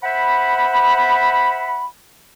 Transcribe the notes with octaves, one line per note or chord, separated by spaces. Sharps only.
C5 E5 F#5 B5